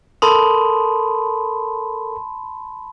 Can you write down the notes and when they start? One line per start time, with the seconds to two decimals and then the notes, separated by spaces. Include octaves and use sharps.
0.22 A4 A#4 A5 B5 C6 D#6